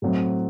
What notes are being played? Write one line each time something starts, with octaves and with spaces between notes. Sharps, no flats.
A2 F#3 C4